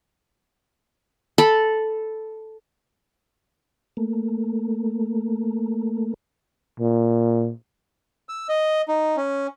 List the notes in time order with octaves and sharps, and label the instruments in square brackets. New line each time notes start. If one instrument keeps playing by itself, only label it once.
[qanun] A4 B5
[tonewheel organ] A3 A#3
[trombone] A#2
[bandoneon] E6
D#5
D#4
C#4